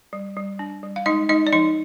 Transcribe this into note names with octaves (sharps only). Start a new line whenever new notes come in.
G3
G3
D4
G3
F5
G#3 D#4 D#5
G#3 D#4 D#5
D5
F3 D#4 D#5